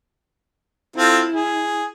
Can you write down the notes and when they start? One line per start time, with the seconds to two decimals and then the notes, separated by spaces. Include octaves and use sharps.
0.96 C4 E4 F4 A4
1.33 G#4